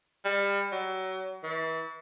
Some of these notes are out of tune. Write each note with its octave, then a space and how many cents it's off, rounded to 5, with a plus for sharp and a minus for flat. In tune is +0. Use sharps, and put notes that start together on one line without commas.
G3 +30
F#3 +30
E3 -35